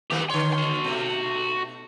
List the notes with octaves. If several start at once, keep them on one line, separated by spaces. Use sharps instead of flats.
D#3 A3 A#3 G4 B4
D3 C#5 C6
F#4 C6
B2 A3